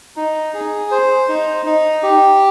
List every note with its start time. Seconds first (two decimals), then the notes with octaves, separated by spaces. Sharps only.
0.16 D#4
0.54 G#4
0.91 C5
1.28 D#4
1.66 D#4
2.03 G4